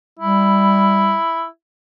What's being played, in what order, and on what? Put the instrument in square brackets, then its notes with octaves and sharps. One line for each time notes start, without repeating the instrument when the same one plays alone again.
[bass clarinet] G3 [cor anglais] E4